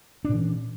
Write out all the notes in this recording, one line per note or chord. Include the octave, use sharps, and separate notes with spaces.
A#2 E3 C#4 D4